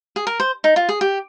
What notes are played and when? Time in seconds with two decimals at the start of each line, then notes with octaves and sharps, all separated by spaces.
0.16 G#4
0.27 A#4
0.40 C5
0.64 D#4
0.76 F4
0.89 G#4
1.01 G4